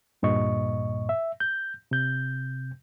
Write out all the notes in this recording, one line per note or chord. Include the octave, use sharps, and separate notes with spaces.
D2 G2 A#2 D#5 C#6
E5
G6
C3 G6